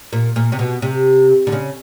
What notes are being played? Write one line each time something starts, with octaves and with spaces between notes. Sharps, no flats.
A#2
A#2
C3
B2
C3
D3
C#3